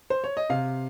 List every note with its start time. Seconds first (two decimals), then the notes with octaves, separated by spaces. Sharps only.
0.10 C5
0.24 C#5
0.37 D#5
0.50 C3 F5